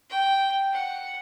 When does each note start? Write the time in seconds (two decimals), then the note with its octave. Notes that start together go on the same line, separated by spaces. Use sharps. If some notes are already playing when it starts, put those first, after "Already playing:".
0.10 G5
0.73 F#5